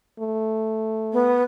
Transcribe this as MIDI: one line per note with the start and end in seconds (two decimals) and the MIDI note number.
0.19 1.41 57
1.12 1.42 59